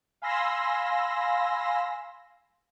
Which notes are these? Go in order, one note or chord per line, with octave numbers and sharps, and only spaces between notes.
F5 G#5 B5 C6 E6 A#6